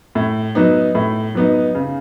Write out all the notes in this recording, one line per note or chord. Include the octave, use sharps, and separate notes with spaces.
A2
F#3 B3 D#4
A2
F#3 B3 D#4
C#3